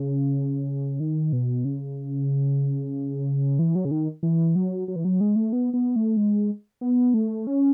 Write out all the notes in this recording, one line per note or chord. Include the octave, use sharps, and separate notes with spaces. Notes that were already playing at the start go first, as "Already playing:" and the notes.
Already playing: C#3
D#3
B2
C#3
E3
F#3
C#3
D#3
E3
F#3
F#3
E3
F#3
G#3
A3
B3
B3
A3
G#3
B3
A3
C#4